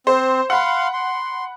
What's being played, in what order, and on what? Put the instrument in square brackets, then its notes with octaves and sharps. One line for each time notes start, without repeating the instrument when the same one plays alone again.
[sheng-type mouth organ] C4 [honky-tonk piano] C5
[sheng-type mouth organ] F5 C6 [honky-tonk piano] F#5 B5
[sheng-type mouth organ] C6